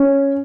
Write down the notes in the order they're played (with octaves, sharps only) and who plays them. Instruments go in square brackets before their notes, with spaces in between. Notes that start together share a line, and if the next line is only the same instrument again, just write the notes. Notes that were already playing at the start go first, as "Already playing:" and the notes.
Already playing: [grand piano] C#4